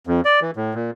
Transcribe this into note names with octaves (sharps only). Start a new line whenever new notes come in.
F2
D5
E3
A2
A#2